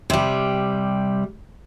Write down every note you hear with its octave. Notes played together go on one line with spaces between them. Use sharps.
C3 G3